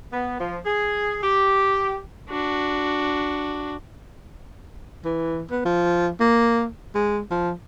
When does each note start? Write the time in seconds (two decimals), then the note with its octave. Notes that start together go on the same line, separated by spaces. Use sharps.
0.13 B3
0.40 F3
0.66 G#4
1.22 G4
2.29 D4 F#4
5.05 E3
5.51 B3
5.65 F3
6.20 A#3
6.95 G#3
7.31 F3